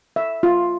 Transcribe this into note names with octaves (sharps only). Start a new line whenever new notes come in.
E5
F4